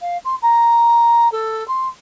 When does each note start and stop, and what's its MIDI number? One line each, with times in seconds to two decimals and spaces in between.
0.01 0.17 77
0.25 0.35 84
0.42 1.30 82
1.32 1.66 69
1.68 1.88 84